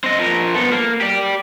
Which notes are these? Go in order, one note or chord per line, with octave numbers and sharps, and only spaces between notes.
C4 D#5
F3 A#4
B3 A4
A#3
G4 D5